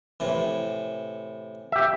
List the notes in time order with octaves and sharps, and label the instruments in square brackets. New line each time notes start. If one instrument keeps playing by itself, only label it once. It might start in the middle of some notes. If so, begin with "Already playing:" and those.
[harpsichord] A2 C3 E3
[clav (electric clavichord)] G4 E5